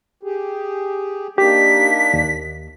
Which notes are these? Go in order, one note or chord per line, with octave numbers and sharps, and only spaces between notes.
G4 G#4
A#3 D4 D#4 G4 B6
D#2